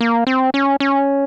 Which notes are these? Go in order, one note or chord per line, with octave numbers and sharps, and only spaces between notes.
A#3
C4
C#4
C#4